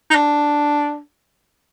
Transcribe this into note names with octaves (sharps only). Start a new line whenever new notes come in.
D#4
D4